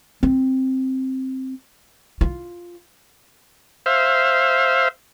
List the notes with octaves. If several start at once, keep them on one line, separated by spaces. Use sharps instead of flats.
C4
F4
C5 E5 F5